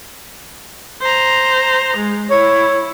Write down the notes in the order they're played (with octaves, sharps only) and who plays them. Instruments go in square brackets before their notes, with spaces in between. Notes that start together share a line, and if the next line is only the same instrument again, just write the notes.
[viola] C5 A#5
G#3
[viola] E4 [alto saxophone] C#5